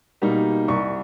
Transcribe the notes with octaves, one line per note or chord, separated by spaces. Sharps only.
B2 G3 A#3 D#4
C2 C#6